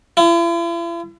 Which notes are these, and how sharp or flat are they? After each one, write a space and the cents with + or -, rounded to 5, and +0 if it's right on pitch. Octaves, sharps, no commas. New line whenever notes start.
E4 +45